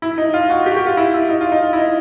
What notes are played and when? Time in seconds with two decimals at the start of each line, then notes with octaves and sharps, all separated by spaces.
0.02 E4
0.18 D#4
0.34 F4
0.50 F#4
0.66 G4
0.72 F#4
0.77 G4
0.87 F4
0.97 E4
1.14 E4
1.29 D#4
1.41 F4
1.52 D#4
1.62 F4
1.73 E4
1.78 D#4